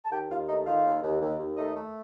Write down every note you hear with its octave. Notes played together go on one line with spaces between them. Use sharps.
A5
D#2 G4 G5
D#2 F4 F5
A3 D#4 D#5
D#3 F4 F5
D#2
D#2
D#2
D#2
A3 D#4 D#5
A3